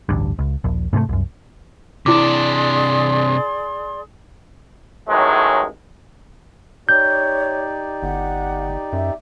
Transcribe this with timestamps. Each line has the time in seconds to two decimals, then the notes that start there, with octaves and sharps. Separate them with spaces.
0.09 A1 D2 G2
0.39 C#2
0.64 D#1 A#1
0.93 G#2 C3 G3 A3
1.09 C2 F#2
2.06 C3 D4 E4 G#4 D5 C6 D6
5.08 A1 A2 D#3 F#3 G#3
6.89 D#4 G4 C#5 D5 G6
8.03 G1 F#5
8.93 F#2 E5